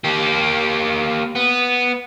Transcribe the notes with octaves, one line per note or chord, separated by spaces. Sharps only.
A#3 G4
B3